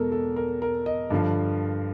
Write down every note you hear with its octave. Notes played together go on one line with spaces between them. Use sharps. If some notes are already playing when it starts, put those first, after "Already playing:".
Already playing: E2 B2 G#3 A4 A#4
A4
A#4
A#4
D#5
G2 D3 F3